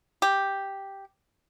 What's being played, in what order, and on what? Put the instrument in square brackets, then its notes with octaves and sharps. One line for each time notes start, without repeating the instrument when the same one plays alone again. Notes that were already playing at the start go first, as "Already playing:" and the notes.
[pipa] G4